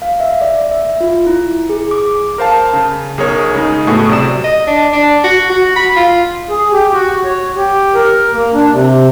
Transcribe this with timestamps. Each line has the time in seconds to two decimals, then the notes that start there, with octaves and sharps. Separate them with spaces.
0.02 F5
0.20 E5
0.41 D5
0.71 E5
1.01 F4
1.27 E4
1.70 G#4
1.91 D6
2.38 A#4 C5 F5 A5
2.74 C#3
3.18 B1 G#4 A#4 C#5
3.55 C#3 G#3 D#4 G#4
3.87 A2 A3 B3 F#4 G#4
4.09 C3 F#3 D5 E7
4.44 D#5
4.67 D4
4.93 D4
5.24 F#4
5.50 F#4
5.76 B5
5.96 F4
6.49 G#4
6.72 G4
6.93 F#4
7.25 C#5
7.56 G4
7.95 A#4
8.33 A#3
8.53 D4
8.72 C3